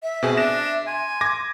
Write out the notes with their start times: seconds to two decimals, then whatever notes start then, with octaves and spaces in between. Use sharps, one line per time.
0.03 E5
0.23 B2 C4 G#4
0.37 D4 A#6 E7
0.87 G#5 C6
1.21 D6 G#6 A#6